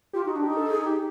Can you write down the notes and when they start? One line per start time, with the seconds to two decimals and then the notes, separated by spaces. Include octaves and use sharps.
0.13 F4 G4
0.25 D#4
0.28 F#4
0.35 D4
0.42 D#4 G4
0.57 A4
0.71 G#4
0.86 G4